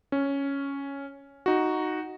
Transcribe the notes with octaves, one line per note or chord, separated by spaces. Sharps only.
C#4
D#4 F#4